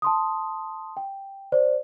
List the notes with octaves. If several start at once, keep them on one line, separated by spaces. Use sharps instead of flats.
A5 C6 D#6
G5
C5 D5